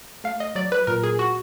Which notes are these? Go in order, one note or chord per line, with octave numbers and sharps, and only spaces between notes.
A3 F5
D#5
F#3 D5
B4
A#2 A#4
G#4
F#4